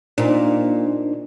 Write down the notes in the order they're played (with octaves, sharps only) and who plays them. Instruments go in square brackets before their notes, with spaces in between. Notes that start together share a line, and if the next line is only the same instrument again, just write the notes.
[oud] A#2 [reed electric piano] D4 D#4 C5